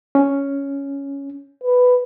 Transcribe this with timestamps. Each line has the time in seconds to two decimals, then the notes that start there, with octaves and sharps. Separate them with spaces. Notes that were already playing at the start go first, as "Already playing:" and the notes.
0.15 C#4
1.64 B4